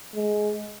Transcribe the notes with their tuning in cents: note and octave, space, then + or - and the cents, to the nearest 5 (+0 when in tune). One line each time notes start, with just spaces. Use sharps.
G#3 +15